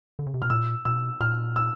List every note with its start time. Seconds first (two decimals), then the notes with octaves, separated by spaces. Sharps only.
0.19 D3
0.27 C#3
0.34 C3
0.42 B2 F6
0.50 A#2 E6
0.85 B2 E6
1.20 A#2 F6
1.56 E6